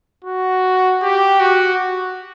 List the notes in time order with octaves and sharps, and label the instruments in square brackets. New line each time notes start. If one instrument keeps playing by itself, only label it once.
[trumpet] F#4
G4
F#4